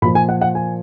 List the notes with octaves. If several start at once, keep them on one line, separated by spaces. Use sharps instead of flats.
A#2 F3 B5
G#5
F#5
F#5
G#5